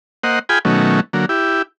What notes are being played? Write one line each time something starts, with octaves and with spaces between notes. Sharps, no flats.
A#3 C5 D#5 F#5
F4 G#4 G5 G#5 B5
B2 D#3 F#3 A3 C#4
D3 F#3 A#3
E4 G4